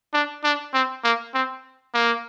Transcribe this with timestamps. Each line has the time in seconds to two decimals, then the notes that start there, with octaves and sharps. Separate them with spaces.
0.14 D4
0.44 D4
0.74 C4
1.04 A#3
1.34 C4
1.94 A#3